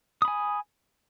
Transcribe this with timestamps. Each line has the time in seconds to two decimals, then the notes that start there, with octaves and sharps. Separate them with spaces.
0.22 D#6
0.25 B5
0.28 G#5